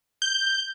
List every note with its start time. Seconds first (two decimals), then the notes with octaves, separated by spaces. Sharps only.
0.22 G6